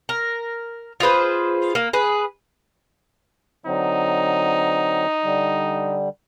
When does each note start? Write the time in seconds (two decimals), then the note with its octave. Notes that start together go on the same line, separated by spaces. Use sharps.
0.09 A#4
1.00 F4 G#4 B4 C5
1.75 A#3
1.93 G#4 B4
3.66 D3 F#3 C4 D#4
5.24 D3 G3